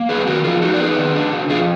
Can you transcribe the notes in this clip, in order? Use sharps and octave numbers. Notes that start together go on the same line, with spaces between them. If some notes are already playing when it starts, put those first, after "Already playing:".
Already playing: A#3
F#2 G#4 B4
D#3 F#4 A#4
F3 F4 G#4
D#4 F#4 A#4
D5
B3 G#4 B4
D#3
D4
B2
F2 F4 G#4